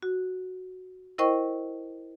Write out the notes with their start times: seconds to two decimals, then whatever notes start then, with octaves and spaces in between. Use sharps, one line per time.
0.02 F#4
1.18 E4 A#4 C5 D#5 G5 C#6